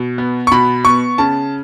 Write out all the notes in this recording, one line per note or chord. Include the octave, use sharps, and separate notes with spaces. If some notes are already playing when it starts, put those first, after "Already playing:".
Already playing: B2
B3
C#6
B2 B5
B3 C#6
C#3 A5